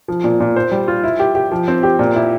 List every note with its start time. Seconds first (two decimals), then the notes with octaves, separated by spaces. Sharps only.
0.08 F3
0.24 A#2
0.40 A#2
0.56 C5
0.72 G3
0.88 F4
1.04 E4
1.20 G4
1.35 G4
1.52 F3
1.68 C4
1.83 G4
1.99 A#2
2.16 E4